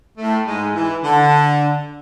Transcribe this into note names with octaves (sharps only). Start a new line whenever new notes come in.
A2 A3
G#2 G#3
E3
D3